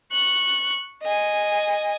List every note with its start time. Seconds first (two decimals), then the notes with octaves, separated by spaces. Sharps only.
0.12 C#6 F#6
1.03 D#5 G#5